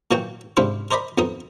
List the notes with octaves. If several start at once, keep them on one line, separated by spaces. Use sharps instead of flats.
A#2 E3 F#3 F#4 F#5 G5
G#2 C3 D4 E4 C5 F5
A#4 C5 D5 D#5 B5
F2 B3 D#4 D#6